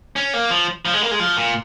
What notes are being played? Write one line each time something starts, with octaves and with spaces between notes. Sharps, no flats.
C#4
A#3
F3
F3
G#3
A#3
G#3
F3
A#2